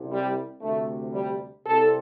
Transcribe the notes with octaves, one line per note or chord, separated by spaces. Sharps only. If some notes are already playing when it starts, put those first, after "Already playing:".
Already playing: C2 C3
G3
D2 C3 A3
G3
C2 C3 A4